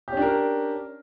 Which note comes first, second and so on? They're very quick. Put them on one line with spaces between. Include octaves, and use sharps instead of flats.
G4 C#4 D4 A#4